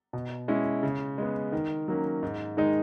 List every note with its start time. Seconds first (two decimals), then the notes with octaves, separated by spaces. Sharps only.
0.13 B2
0.48 G#3 C#4 E4
0.83 C#3
1.18 G#3 B3
1.52 D#3
1.88 F#3 A#3 C#4
2.23 G#2
2.57 D#3 G#3 D#4